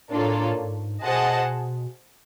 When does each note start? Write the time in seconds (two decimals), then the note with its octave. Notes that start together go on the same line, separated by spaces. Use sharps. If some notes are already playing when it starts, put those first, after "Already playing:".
0.11 A2 A#3 D4 F4 A4 C#5
0.57 G#2
1.03 B2 G#4 C5 D#5 F#5 A5